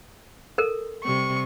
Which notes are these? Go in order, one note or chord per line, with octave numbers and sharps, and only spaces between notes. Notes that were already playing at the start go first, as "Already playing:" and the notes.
A4 A#4
C3 G3 C#6